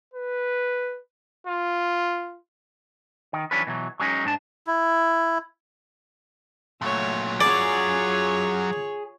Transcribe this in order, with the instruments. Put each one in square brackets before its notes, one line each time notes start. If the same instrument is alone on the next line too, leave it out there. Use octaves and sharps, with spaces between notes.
[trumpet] B4
F4
[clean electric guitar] D#3
E3 F#3 C#4 D4 B4
B2 E3 F#3
F#3 G#3 C#4 D#4
G#2 D4 A5
[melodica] E4
[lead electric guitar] A#2 F#3 [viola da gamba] A3 C#5
[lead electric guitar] F#2 F#3 [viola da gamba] F4 C#5 [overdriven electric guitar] G#4 [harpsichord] D5